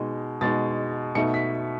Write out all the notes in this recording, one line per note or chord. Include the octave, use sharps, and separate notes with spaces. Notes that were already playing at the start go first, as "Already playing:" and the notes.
Already playing: B2 G#3 D#4
B2 G#3 D#4 A6
B2 A3 D#4 C#7
B6